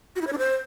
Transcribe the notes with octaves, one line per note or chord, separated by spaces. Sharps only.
F#4
E4
C#5
D4
C5